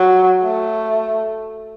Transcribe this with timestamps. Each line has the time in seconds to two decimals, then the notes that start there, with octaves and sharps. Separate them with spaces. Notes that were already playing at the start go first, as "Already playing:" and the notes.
Already playing: F#3
0.43 A3